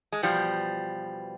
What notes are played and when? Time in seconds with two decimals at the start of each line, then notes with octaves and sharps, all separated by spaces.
0.12 G#3
0.23 E2 B2 F3 G3